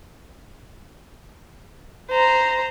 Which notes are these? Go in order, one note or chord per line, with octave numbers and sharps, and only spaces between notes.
C5 A#5